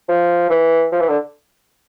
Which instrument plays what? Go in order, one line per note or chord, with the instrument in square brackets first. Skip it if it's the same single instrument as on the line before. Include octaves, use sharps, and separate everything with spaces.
[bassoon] F3
E3
F3
E3
D3